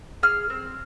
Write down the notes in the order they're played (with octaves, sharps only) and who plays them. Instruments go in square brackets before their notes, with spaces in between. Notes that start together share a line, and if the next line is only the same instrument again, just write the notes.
[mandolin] G#4 F6
C4